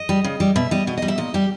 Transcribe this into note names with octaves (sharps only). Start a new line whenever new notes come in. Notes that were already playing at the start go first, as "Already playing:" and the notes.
Already playing: D#5
G3
C#3
G3
B2 E5
G3 D#5
B2 D#5
D#5
G3
E5
A#2 D#5
G3 G4